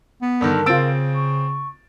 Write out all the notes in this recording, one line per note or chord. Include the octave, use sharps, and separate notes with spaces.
B3
G2 D3 D#3 A#4
C#3 C4 F4 E6 A6 D7
C#6